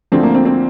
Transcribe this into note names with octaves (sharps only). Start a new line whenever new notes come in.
D2 D3 F3 C4
A#3
C4
C4